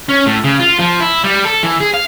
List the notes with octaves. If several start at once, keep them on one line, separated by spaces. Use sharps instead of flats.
C#4
A2
C#3
F4
F3
E4
G3
A4
E3
G#4
F5